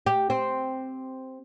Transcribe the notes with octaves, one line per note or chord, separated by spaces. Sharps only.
G4
C4